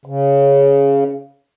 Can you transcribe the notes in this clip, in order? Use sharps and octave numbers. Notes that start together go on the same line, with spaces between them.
C#3